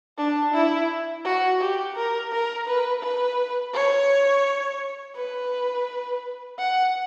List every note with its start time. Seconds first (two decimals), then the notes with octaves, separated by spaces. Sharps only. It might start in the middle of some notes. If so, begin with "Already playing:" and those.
0.18 D4
0.53 E4
1.25 F#4
1.60 G4
1.95 A#4
2.32 A#4
2.67 B4
3.03 B4
3.74 C#5
5.16 B4
6.59 F#5